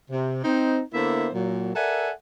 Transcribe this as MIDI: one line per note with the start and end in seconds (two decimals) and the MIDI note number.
0.10 0.44 48
0.44 0.80 60
0.44 0.80 63
0.93 1.29 50
0.93 1.29 58
0.93 1.29 59
0.93 1.29 64
0.93 1.29 72
0.93 1.29 76
1.33 1.73 46
1.33 1.73 54
1.75 2.10 69
1.75 2.10 70
1.75 2.10 74
1.75 2.10 76
1.75 2.10 78
1.75 2.10 80